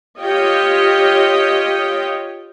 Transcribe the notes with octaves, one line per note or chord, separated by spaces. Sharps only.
F4 G4 C#5 D#5 G5